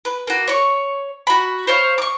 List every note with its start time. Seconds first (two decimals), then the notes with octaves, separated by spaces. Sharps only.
0.05 B4
0.27 A#3 F#4
0.48 C#5 C#6
1.27 F#4 B5
1.67 C5 C#5 F5
1.98 C#6 D6